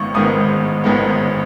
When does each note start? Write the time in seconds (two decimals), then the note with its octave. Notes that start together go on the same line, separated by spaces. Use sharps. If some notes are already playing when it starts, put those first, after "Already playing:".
Already playing: A1 G#2 D#3 G#3 B3 C#6
0.14 A1 G#2 D#3 G#3 B3 D#6
0.84 A1 G#2 D#3 G#3 B3